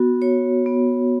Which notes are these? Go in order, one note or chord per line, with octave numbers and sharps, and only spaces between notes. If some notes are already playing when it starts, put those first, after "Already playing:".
Already playing: B3 F#4
C#5
B3